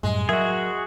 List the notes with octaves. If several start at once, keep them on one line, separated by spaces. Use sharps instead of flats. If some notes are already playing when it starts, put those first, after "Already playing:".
F#2 A2 G3 G#3
F#3 F#4 G#4 A#4 E5